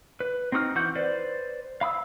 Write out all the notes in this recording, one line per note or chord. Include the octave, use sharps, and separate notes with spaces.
B4
C4 D#4 F#4 D#6 F6
E3 F#4 F#5 G6
B4 C5 D5
F5 B5 D#6 E6